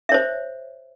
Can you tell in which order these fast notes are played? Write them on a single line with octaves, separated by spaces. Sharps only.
E5 C#5 C5